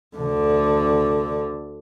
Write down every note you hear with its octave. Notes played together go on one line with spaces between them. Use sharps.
D2 D3